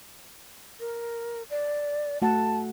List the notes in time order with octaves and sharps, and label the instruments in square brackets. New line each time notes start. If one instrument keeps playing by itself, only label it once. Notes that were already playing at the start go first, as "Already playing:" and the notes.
[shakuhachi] A#4
D5
[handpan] A3 F#4 F#5 [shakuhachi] A5